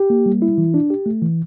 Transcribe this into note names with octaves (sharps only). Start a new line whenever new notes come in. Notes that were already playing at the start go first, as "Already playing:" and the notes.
Already playing: G4
A#3
G3
E4
E3
D4
G4
A3
E3